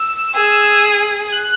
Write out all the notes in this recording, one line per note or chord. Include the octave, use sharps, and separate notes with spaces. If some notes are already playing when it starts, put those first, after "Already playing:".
Already playing: E6
G#4
F#6